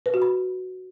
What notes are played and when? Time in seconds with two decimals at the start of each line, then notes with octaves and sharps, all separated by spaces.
0.06 B4
0.14 F#4
0.22 B5